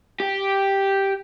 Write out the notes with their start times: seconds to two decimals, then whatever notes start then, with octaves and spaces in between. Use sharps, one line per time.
0.20 G4